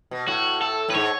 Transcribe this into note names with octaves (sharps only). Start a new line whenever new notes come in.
B2
A2 F#4
A4
A2 B4
G#2 C#5